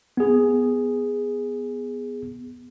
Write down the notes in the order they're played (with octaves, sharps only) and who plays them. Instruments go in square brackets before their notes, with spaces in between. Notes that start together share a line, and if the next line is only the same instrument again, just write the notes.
[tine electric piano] B3 G#4